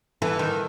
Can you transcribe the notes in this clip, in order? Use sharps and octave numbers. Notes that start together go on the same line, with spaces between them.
E3 A4 B4
D#3